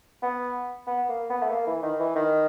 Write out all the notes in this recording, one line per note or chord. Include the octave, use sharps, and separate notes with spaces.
B3
B3
A#3
B3
A3
A#3
E3
D#3
E3
D#3